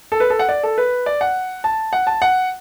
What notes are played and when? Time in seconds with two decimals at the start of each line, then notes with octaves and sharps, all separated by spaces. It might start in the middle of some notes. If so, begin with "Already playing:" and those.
0.12 A4
0.20 B4
0.30 A4
0.39 F#5
0.49 D5
0.63 A4
0.78 B4
1.06 D5
1.21 F#5
1.64 A5
1.93 F#5
2.07 A5
2.22 F#5